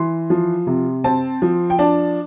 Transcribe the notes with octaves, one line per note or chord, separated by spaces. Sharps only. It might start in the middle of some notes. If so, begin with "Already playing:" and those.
Already playing: E3 C6
F3
C3
C4 A5
F3
G5
D4 A5